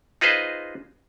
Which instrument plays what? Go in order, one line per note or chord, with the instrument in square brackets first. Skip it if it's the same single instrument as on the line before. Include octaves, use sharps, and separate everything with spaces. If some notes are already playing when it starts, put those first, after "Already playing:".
[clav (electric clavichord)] D#4 F4 G#4 B4 C5 D#5